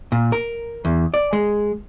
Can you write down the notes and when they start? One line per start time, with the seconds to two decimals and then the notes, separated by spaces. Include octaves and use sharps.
0.12 A#2
0.32 A#4
0.85 E2
1.14 D5
1.33 G#3